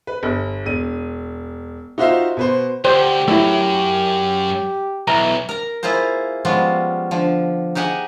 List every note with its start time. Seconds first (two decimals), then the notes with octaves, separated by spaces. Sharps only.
0.07 B4
0.23 G1
0.65 E1 D#7
1.98 D#4 F4 F#4 C5 E5 F5
2.37 B2 B4 C5
2.85 D2 G4 C5
3.28 F#2 A3 E4
5.08 B1 E3 A#5
5.49 A#4 A#5
5.83 A#3 E4 F4 G#4 C5
6.45 F3 G3 G#3 B3 C#4 F4
7.11 D3 F3
7.75 D#4 G4 G#4 F#5 G#5